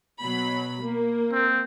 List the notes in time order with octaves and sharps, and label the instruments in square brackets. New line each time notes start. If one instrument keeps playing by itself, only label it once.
[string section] B2 F#3 B5
A#3
[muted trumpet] C4